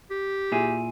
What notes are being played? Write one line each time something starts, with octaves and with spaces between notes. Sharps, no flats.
G4
A#2 E4 G#4